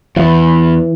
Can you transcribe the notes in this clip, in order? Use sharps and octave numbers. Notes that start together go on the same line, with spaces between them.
E2 E3